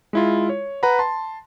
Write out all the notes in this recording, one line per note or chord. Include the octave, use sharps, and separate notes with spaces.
G#3 E4 F4
C#5
B4 F#5 A#5 B5
A5 C6